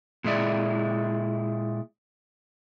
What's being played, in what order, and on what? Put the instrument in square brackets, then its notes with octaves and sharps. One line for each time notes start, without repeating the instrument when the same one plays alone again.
[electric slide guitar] A#2 G#3 E4 D5